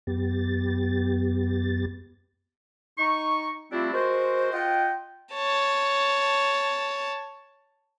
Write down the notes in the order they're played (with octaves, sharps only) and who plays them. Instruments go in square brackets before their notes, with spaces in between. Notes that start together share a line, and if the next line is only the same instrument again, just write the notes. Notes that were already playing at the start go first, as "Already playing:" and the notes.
[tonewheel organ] F#2 B3 G4 A6
[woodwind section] D#4 C#6
G3 A3 C4 D4 E4 F4
G#3 F#4 A#4 C5
F4 D#5 F#5 G5
[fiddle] C#5 A5